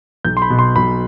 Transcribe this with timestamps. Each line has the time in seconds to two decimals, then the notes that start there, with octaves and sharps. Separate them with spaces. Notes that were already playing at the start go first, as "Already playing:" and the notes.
0.24 B1 G6
0.37 C6
0.42 B5
0.50 B2
0.59 C6
0.76 B1 B5